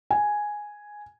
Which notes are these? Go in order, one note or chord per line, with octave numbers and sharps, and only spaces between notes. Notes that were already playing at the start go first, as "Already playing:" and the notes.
G#5